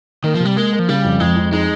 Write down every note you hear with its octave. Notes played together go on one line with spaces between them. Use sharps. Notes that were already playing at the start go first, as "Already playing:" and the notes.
D#3 A#3
F3
C3
G3
G#3 A#3
A#3
F3
C#3 G3
F2
F2 G#3
F2
G#3 D#4